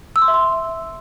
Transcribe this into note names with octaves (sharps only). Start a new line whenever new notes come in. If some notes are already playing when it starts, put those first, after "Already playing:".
E6
C6
E5
C6